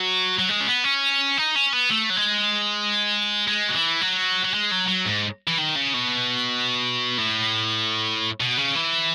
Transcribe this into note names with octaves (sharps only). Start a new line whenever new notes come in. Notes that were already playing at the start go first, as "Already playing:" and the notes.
Already playing: F#3
F#3
G#3
C#4
B3
C#4
D#4
C#4
B3
A3
F#3
G#3
G#3
F#3
E3
F#3
F#3
G#3
F#3
F#3
G#2
E3
D#3
C#3
B2
A2
B2
C#3
E3